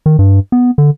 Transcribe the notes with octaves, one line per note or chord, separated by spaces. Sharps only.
D#3
G2
B3
D3